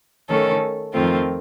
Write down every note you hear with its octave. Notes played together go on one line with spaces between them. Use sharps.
D#3 A3 C#4 A4
F2 D#3 A3 C4 F4